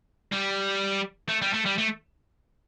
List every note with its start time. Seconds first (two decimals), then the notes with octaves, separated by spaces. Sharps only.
0.32 G3
1.29 A3
1.42 G3
1.54 A3
1.66 G3
1.78 A3